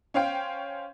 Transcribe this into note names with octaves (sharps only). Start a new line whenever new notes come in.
C#4 C5 F5 G5